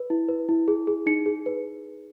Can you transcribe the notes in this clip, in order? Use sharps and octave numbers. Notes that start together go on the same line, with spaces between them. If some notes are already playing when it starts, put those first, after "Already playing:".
Already playing: B4
E4
B4
E4
G#4
G#4
D#4 C#7
G#4
B4